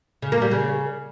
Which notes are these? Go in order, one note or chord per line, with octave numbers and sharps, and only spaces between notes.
C#3
A#3
G3
C#3